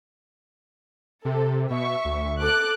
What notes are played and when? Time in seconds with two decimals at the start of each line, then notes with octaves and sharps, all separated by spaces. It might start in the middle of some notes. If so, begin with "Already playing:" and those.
1.25 C3 A4
1.70 B2 E5 C#6
2.05 D2
2.42 A4 D6 F#6